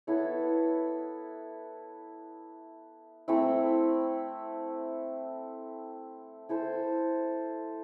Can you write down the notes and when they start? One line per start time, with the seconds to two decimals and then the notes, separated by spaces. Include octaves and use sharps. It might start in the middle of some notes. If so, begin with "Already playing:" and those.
0.07 B3 E4 A4 C#5
3.28 A3 C4 E4
6.49 E4 A4 C5